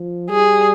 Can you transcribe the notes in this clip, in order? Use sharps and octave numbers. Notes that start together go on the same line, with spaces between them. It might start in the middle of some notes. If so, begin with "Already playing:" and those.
Already playing: F3
G3 G#4